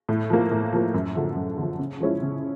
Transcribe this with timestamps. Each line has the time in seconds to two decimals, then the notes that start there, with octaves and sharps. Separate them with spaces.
0.09 A2
0.30 F3 A#3
0.51 A2
0.73 F3 A#3
0.94 F#2
1.15 D3 F3
1.36 F#2
1.58 D3 F3
1.79 C#3
2.00 F3 G#3 C#4 E4
2.22 C#3